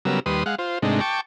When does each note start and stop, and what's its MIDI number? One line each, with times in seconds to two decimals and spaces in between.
0.05 0.20 49
0.05 0.20 54
0.05 0.20 55
0.05 0.20 59
0.05 0.20 70
0.05 0.20 88
0.26 0.44 39
0.26 0.44 55
0.26 0.44 71
0.26 0.44 84
0.26 0.44 87
0.46 0.55 56
0.46 0.55 77
0.46 0.55 78
0.59 0.79 65
0.59 0.79 72
0.82 1.01 44
0.82 1.01 48
0.82 1.01 56
0.82 1.01 57
0.82 1.01 62
0.82 1.01 63
1.01 1.21 79
1.01 1.21 81
1.01 1.21 85
1.01 1.21 86